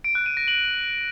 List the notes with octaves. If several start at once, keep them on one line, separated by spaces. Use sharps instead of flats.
D7
F#6
D#7
A#6
F#7